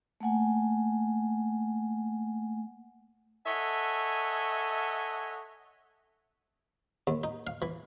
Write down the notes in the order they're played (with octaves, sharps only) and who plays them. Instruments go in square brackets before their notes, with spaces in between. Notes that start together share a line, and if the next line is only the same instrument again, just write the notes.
[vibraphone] A3 A#3 F#5 G#5
[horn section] A4 C#5 D#5 E5 F#5 G#5
[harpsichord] D#2
D#4
F5
E3